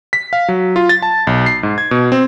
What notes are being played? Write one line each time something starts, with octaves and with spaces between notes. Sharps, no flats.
B6
F5
F#3
F4
A6
A5
B1
C7
G#2
G#6
B2
C4